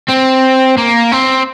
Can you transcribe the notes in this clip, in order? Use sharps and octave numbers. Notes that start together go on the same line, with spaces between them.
C4
A#3
C4